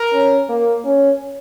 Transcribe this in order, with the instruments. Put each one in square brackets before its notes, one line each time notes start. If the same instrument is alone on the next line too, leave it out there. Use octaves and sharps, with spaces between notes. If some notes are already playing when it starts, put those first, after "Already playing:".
Already playing: [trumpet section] A#4
[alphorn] C#4
A#3
C#4